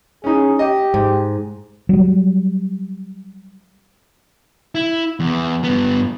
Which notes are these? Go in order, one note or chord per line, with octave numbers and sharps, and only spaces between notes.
C#4 D#4 G#4
G4 D#5
G#2
F#3 G3
E4
E2
G2 B3